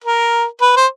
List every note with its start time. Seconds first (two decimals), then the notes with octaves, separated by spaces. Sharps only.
0.04 A#4
0.61 B4
0.76 C5